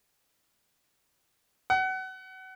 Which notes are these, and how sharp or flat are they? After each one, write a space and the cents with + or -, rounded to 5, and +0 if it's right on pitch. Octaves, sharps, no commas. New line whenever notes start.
F#5 +30